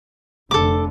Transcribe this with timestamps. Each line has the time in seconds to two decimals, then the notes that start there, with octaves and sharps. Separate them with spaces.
0.51 F1 D3 A4 D6